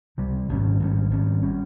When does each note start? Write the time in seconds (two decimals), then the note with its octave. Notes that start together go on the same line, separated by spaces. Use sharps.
0.18 C#2 C3 G3
0.49 G#1 G#2 G3 C#4
0.80 G#1 G#2 G3 C#4
1.11 G#1 G#2 G3 C#4
1.43 G3 C#4